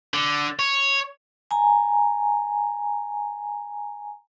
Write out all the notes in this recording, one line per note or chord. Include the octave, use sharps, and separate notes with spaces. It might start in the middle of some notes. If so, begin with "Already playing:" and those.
D3
C#5
G#5 A#5